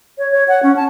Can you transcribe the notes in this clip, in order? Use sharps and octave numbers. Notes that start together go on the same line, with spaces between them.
C#5
C#5
F#5
C#4
A5